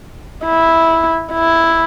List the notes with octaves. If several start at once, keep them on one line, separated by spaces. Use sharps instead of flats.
E4
E4